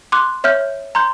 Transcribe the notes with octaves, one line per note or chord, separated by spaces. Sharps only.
C6 D6 F#6
C#5 E5 F6 G6
A#5 C6 G6